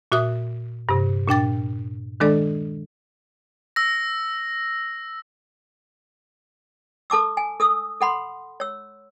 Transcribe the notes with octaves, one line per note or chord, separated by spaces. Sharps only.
A#2 F#4 E5 D#6
G2 C3
A#2 D4 G5 A6
D#3 G#3 D4 A4 D5
E6 A#6
A4 A5 D6 E6
G#5
A4 D#6 E6
A4 F#5 B5 C6
C#5 E6